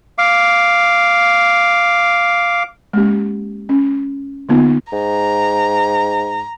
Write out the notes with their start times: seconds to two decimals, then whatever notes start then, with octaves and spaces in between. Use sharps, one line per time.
0.18 F5 D6
2.93 G#3 A#3 C#4 G4
3.69 C#4
4.49 D3 A#3 B3 D#4 F4
4.93 G#2 A#5